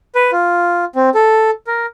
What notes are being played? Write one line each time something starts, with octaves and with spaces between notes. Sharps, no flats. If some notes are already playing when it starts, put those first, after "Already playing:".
B4
F4
C4
A4
A#4